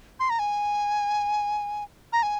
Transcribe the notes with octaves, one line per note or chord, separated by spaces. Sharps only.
C6
A#5
G#5
A#5
G#5